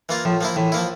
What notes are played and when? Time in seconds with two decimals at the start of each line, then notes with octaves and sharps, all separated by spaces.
0.09 E3 A#3 F4
0.25 A2 F3
0.41 F3 A#3 E4
0.56 A2 E3
0.72 F3 A#3 E4